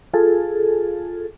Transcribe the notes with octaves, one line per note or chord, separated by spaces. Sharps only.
F4 G#4 A4